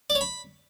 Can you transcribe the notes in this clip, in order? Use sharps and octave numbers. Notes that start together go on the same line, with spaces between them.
D5
C#5
B5